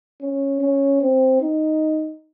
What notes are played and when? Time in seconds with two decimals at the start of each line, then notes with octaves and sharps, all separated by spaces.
0.21 C#4
0.61 C#4
1.01 C4
1.41 D#4